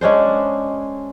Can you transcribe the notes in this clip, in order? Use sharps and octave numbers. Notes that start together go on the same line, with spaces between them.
G#3 C#4 D4 C5